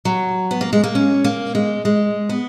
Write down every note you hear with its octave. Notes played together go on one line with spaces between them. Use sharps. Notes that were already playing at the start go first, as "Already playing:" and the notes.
F#3
B3
A#3
G#3
A#3
C#4
A#3
G#3
G#3
B3